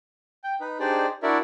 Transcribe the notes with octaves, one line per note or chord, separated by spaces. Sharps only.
G5
D#4 B4
D4 D#4 G4 G#4 C5 D5
D4 E4 F#4 A#4 D5 E5